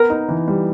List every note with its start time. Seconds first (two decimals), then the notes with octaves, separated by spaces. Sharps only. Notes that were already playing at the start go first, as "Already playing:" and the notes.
Already playing: B3 A#4
0.10 D#4
0.29 E3
0.48 G3